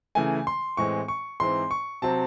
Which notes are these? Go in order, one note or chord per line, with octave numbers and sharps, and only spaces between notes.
C#3 E3 A3 G#5
C6
A2 E3 G#3 C4 C#6
C#6
G#2 E3 C4 C6
C#6
C3 F#3 C4 A5